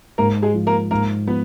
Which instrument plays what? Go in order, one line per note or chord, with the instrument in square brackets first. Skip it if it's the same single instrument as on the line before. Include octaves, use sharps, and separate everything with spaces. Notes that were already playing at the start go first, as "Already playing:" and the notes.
[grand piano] G#2 [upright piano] A#3 A#4
[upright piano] G#3 G#4
[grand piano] F3
[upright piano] A#3 A#4
[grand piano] G#2 [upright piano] A#3 A#4
[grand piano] F3 [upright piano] B3 B4